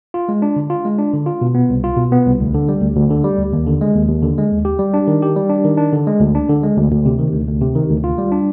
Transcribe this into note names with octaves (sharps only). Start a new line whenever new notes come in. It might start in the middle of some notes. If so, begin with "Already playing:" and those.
F4
G#3
D4
D3
F4
G#3
D4
D3
F4
B2
B3
C2
F4
B2
B3
C2
D2
D3
G3
D2
D2
D3
G3
D2
D#2
D3
G#3
D#2
D#2
D3
G#3
D#2
G4
G3
D4
D#3
G4
G3
D4
D#3
D4
D3
G#3
D2
D4
D3
G#3
D2
D2
C3
D#3
D2
D2
C3
D#3
D2
F4
G3
D4